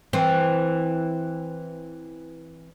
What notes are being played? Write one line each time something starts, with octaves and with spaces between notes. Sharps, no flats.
E3 C4